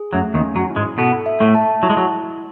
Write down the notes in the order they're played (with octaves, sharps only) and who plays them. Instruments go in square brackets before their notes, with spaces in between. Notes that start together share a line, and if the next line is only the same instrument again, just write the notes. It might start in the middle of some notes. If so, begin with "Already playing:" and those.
Already playing: [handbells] G#4
[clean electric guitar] F#2 F#3 [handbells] A3
[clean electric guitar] D#2 D#3
[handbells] C#4
[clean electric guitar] F#2 F#3
[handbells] E4
[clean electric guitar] G#2 G#3
[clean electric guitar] B2 B3 [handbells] A4
[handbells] E5
[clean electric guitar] A2 A3
[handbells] A5
[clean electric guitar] F#3 [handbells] E4
[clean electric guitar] G#3
F#3